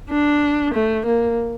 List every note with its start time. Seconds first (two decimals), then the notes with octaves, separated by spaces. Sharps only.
0.11 D4
0.74 A3
1.06 A#3